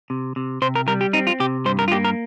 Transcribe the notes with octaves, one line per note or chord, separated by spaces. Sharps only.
C3
C3
C3 C5
A#4
G3 A#4
G4
C4 D#4
F4
C3 G4
G2 C5
A#4
F4
A#3 G4
A#4